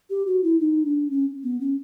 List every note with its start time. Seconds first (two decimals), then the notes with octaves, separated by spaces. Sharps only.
0.10 G4
0.27 F#4
0.44 E4
0.60 D#4
0.85 D4
1.10 C#4
1.44 B3
1.61 C#4